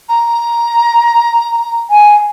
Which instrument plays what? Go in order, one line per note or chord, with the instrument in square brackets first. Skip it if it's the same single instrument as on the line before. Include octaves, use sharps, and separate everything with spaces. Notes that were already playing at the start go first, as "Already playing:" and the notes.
[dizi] A#5
[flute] G#5